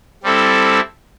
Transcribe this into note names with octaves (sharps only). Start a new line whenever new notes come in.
G3 C4 E4 A4